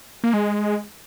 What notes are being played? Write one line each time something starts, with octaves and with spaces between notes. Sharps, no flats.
A#3
G#3